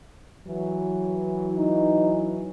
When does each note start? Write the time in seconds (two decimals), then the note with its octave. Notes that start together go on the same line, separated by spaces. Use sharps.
0.47 E3 F#3
1.57 D#4